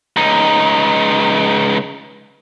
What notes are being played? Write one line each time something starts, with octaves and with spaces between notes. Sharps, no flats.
C#2 D#4